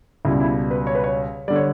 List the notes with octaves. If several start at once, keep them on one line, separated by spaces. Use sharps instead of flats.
C#2 B2 G3 E4
E4
B4
C#5
B4
C#5
D3 G3 D5
C#5